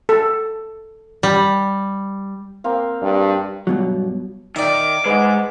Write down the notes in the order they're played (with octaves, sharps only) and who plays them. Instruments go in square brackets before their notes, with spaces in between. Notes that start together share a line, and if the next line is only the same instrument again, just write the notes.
[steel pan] A4
[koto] G3
[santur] A#3 C4 F5
[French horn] G2
[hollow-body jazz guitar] G2 B2 F#3
[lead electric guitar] D#3 [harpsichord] D5 E5 [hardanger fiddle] D6
[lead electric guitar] G#2 G#3 [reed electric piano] B4 D#5 F#5